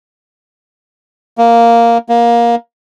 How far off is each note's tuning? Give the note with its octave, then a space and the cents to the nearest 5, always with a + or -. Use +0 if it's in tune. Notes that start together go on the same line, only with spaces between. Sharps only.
A#3 +0
A#3 +15